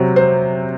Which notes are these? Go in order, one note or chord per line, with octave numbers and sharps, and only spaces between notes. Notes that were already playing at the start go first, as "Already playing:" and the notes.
Already playing: C3 F#3 C4
C5